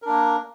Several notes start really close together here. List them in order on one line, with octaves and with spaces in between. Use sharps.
A#4 D4 A#3